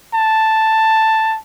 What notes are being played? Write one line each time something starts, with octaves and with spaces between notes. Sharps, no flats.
A5